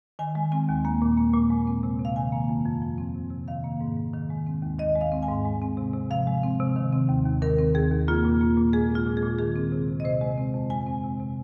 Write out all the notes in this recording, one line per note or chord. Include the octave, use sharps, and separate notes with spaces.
D#3 G#5
G#3
C4 G#5
D#2
A#3
A#2
A#3
A#2
G#3
C4
C3
C3
F5
D#3 G#5
A#3
F2
F2
F3
C4
C3
C3
D#3 F5
A#3
G#2
G#2
D#3
G#3
C4
D#2
D#3 D#5
G#3
F5
C4
G#5
G#2
G#3
C4
C3
C3
F3 F5
G#3
C4
C3
D#3
C4
D#2
D#2
D#3 A#4
C4
D#2 G#4
D#2
A#3 F4
A#2
A#3
A#2
G#3 G#4
C4 F4
A#2
G#4
A#2
D#3 G#4
C4
C3
C3
D#5
C3 C5
G#3
C4
F2
G#3 G#5
C4
C3
C3